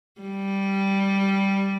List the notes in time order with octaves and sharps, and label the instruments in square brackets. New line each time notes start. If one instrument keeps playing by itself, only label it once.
[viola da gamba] G3